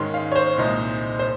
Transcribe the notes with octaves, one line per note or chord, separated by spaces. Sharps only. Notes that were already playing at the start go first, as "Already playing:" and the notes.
Already playing: G#2 D#3 G#3 C#4 C6
F5
C#5
C5
C2 A#2 G#3 D#4
C5